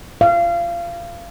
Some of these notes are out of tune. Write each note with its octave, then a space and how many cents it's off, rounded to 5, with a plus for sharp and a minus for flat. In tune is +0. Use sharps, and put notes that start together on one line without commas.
F5 -25